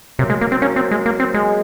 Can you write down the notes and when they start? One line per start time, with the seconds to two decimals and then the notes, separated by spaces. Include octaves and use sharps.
0.19 C3 F#3 A#3
0.30 G#3
0.41 A#3
0.52 C4
0.62 F#3 A#3 C#4
0.76 C4
0.91 G#3
1.06 A#3
1.20 C4
1.34 G#3